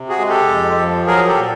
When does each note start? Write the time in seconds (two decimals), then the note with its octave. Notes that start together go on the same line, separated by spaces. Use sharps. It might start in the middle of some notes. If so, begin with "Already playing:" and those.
Already playing: C3
0.09 F#4 G#4
0.19 G#3
0.29 G4 A4
0.48 F2
0.78 F3
1.06 F#3 G#4 A#4
1.27 G4 A4
1.36 A#2